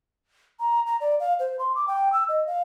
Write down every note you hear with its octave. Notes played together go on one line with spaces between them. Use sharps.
A#5
A#5
D5
F5
C5
C6
D6
G5
E6
D#5
F5